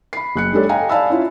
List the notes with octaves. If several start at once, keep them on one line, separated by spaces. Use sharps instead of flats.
B5 C7
F#1 F#6 C#7
G#3 D4 G4 A4 C#5
D#5 F5 G5 G#5 A#5
D5 F5 G#5 A5 B5 E6
C#4 E4 F4